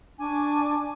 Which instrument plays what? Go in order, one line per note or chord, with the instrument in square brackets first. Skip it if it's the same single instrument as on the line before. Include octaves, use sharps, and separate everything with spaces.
[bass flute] D4 [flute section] G#5 C#6 D6